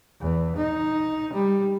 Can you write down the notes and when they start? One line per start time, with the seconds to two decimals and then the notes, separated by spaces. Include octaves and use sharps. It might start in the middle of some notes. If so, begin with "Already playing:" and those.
0.21 E2
0.57 D#4
1.34 G3